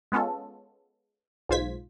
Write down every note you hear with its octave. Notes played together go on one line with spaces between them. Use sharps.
G#3 B3 C#4 F4 A4
B1 G#2 F4 C5 G#6 B6